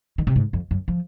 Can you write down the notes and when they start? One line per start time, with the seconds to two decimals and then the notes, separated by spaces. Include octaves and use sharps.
0.18 D#3
0.27 C3
0.36 G#2
0.53 F2
0.71 F#2
0.88 F3